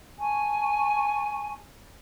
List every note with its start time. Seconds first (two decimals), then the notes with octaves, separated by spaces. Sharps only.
0.20 G#5 A5 C#6